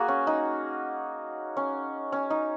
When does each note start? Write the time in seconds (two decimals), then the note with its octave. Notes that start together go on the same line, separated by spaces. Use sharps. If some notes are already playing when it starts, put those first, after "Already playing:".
Already playing: A#3 F#4 G#4
0.08 C#4
0.27 D#4
1.57 C#4
2.12 C#4
2.30 D#4